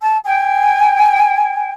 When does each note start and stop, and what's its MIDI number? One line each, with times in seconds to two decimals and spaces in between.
0.01 0.16 81
0.25 1.71 79
0.25 1.71 80